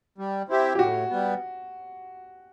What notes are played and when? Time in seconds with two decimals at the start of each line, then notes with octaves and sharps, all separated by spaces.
0.18 G3
0.49 C4 E4 G4
0.75 G4
0.79 A2 F#4
1.10 G3 B3